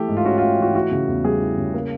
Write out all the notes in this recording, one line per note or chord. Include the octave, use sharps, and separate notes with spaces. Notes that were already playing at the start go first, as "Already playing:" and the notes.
Already playing: E3 A3 G4
G#2
F4
C#4 F#4
A3 F4
E3 F#4
E3 F#4
C#3
E2
G3 G#4
E3
C#3
A#3